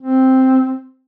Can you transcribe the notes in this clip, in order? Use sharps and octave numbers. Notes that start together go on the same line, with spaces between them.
C4